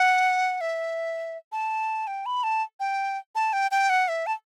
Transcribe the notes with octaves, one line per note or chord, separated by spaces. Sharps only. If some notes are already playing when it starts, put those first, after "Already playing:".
Already playing: F#5
E5
A5
G5
B5
A5
G5
A5
G5
G5
F#5
E5
A5